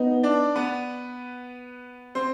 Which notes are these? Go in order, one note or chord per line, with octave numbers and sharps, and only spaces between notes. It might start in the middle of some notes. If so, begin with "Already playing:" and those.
Already playing: B3 D#4
D4 D5
B3 B4
C4 C5